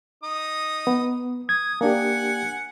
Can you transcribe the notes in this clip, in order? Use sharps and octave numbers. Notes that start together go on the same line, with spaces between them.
D#4 D#6
B3
D#6 G#6
A#3 D4 G4 F#5 G#5